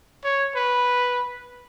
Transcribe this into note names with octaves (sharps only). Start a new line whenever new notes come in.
C#5
B4